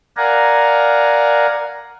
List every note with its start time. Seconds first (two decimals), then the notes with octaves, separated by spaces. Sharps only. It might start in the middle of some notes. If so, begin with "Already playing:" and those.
0.17 A#4 D5 F5 F#5 G#5 A#5